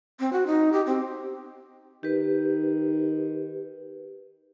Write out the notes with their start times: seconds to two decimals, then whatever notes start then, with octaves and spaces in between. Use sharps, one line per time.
0.20 C4
0.33 F#4
0.47 D#4
0.73 G4
0.86 C4
2.03 D#3 G4 B4